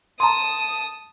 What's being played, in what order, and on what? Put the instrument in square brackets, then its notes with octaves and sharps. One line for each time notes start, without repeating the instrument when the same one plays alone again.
[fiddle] A5 D#6 [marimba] A#5 C6